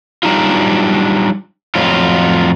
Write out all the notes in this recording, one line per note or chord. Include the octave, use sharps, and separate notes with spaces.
F#3 G3 D4 D#4 F4
F2 A2 F#3 F4